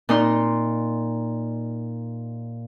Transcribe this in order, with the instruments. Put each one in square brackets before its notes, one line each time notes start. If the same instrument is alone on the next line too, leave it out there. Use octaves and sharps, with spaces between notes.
[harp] A#2 D#4 C6